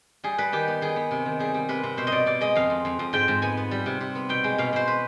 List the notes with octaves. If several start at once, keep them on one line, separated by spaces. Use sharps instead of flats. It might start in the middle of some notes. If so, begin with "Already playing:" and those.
G3 G#4
G3 B4
D#3 G4
B3
D#3 G#4
B3
C3
D#3
G3 G#4
G3
C3 B4
C3
B2 C5
D#5
B2 D5
B2 D5
G#3 D#5
F2 F5
F2
F2
F2
G#2 G5
G#2
B3 G#5
B3
G3
C3
C3
B3
B2 G5
G#3
B2 F5
B2 C5
B4